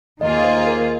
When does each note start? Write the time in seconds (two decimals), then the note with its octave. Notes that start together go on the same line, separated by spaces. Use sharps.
0.21 D#2 D#3 A#3 F4 G#4 D#5
0.44 C5
0.67 A#4